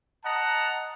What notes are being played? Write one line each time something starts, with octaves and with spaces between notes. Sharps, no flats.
D#5 F#5 A5 A#5